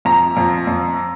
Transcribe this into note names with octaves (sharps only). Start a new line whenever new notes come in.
F2 A#5
F2
F2